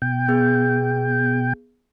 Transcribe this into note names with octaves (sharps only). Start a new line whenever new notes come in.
B2 G5
B3 G#4 G6